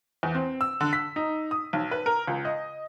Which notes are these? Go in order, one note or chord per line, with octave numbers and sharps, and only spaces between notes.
E2
C4
E6
D3
B6
D#4
D#6
B1
B4
A#4
C#2
D#5